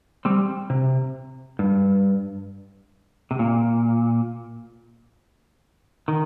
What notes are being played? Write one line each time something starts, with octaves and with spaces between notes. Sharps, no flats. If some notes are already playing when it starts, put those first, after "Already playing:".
G3 C4
C3
G2
C3
A#2
D#3